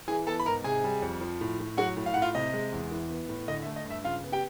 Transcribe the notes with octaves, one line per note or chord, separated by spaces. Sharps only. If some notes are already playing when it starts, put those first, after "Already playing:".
E3 G#4 G#5
B3 A4 A5
B5
G#2 A#4 A#5
C3 G#4 G#5
G3
F2
F3
A2
A2
F#3 F#4 F#5
A2
F5
A2 F#5
F4 F5
C3 D#5
G#3
E2
E3
B3
A2
D3 D#5
E5
A3
D#5
G2
E5
C#3 F4 F5
B3
G4 G5